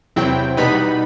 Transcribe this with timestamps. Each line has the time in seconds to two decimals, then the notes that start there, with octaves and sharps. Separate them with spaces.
0.16 E2 C3 F#3 C4 E4 G5
0.57 B2 G3 B3 D#4 B5